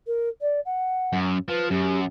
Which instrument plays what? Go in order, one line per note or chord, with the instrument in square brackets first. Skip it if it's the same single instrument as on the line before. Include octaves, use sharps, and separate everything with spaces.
[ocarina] A#4
D5
F#5
[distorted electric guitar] F#2
[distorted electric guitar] F3 [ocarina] B4
[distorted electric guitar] F#2 [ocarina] G4